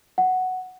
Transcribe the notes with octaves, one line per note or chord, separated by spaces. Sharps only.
F#5